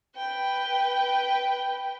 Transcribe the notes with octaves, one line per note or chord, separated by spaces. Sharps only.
B4 G5